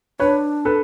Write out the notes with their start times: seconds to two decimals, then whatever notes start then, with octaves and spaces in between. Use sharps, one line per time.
0.20 D4 B4 C#5
0.65 A4 B4